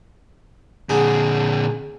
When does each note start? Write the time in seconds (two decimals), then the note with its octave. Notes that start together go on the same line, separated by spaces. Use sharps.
0.89 A#2 D3 G#4